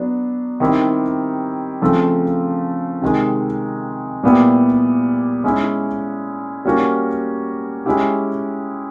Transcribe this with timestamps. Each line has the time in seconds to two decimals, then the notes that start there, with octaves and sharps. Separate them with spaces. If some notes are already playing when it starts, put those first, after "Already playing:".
Already playing: F#3 B3 D4
0.60 D#3 G3 C4 E4 G4
1.81 C#3 F3 A3 C4
3.02 C3 D#3 G#3
4.24 A#2 G3 B3 E4 G4
5.44 G#3 C#4 E4
6.65 G3 A#3 C#4 F#4
7.86 G#3 C#4 E4 G4